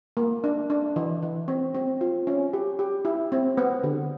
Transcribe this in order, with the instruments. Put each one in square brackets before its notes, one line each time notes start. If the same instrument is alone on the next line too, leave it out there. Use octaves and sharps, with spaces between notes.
[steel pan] A#3
D4
D4
E3
E3
C4
C4
F4
C#4
G4
G4
E4
C4
B3
D3